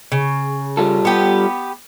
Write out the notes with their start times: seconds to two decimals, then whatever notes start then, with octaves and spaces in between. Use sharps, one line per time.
0.12 C#3
0.77 G3 F4 A4
1.05 B3 G4